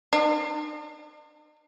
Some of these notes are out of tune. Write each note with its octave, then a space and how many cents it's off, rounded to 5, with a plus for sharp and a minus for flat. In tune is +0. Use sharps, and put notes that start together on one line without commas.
D#4 -40